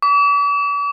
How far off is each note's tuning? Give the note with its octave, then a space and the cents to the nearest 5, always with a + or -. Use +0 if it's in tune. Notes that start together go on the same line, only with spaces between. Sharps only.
D6 -45